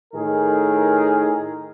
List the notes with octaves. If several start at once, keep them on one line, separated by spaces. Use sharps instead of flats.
A2 D#3 G#4 A#4